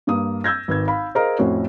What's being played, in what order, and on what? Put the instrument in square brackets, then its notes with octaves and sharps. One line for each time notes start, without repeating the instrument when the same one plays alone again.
[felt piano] G2 A#3 D#6
E6 G6 G#6 A#6
G#1 B4 G#6
F5 B5
G#4 A#4 C5 D#5 F5 A#5
F2 A2 C#4 F#4 C5